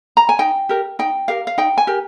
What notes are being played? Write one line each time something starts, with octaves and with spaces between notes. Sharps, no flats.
A#5
G#5
D#4 G5
G4 A#4
D#4 G5
G4 A#4 F5
F5
D#4 G5
G#5
G4 A#4